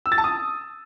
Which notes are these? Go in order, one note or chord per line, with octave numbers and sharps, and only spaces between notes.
E6
A6
A5
D#6